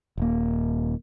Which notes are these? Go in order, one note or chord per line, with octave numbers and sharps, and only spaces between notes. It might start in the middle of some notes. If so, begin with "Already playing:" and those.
D#1 A#3